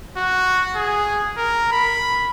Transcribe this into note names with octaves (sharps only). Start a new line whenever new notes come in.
F#4
G#4
A#4
B5